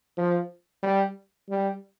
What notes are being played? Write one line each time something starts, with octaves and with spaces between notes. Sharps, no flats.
F3
G3
G3